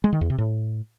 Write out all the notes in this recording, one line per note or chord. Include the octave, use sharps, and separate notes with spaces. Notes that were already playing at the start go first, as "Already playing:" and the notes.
G#3
D#3
E2
C3
A2